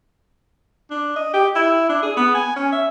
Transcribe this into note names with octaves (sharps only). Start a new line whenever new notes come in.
D4
D#5
G4
E4
D4
G#4
B3
G#5
C#4
E5